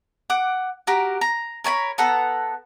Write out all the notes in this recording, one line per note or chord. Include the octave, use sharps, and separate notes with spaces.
F#5 D6
F#4 G4 A#4
A#5
A#4 C#5 G#5 B5
B3 A4 F#5 A#5